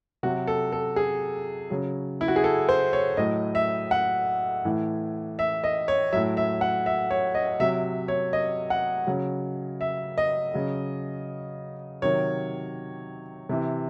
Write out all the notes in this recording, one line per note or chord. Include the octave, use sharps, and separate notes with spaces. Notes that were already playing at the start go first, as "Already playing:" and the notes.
C3 F#3 F#4
A4
A4
G#4
C#3 F#3
E4
F#4
G#4
A4
C5
C#5
A2 F#3 D#5
E5
F#5
A2 E3
E5
D#5
C#5
A2 F#3 E5
E5
F#5
E5
C#5
D#5
C3 F#3 E5
C#5
D#5
F#5
C#3 F#3
E5
D#5
C#3 F#3
C3 D#3 F#3 C#5
C3 E3